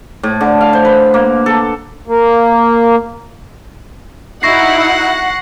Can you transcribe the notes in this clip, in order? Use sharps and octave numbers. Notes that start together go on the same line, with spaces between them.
A2
D3
F5
C5
B4
A#3
A4
A#3
D#4 E4 F#4 F#5 C#6 A#6 C7